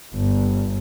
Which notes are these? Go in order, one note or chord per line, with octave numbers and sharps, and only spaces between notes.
G1